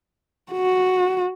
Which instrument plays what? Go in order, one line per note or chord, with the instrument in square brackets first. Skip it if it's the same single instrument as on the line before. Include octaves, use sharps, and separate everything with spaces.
[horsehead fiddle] F#4